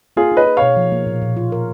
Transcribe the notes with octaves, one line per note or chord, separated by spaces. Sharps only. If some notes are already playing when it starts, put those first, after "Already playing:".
A#3 F4 G#4
D#4
B4 D#5
G#4
B2 C#5 F5
F3
A#3
A#2
A#2
F4
A#4